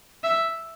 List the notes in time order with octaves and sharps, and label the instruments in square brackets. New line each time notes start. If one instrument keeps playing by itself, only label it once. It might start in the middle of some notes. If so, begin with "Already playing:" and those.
[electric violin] E5